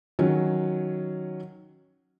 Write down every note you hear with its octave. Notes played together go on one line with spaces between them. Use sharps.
D#3 F#3 C#4